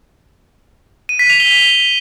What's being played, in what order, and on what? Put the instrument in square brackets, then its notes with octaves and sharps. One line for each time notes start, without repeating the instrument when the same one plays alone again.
[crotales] D#7
B6
F7
G7